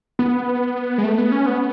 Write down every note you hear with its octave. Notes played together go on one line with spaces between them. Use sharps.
B3
G#3
A3
B3
C#4
B3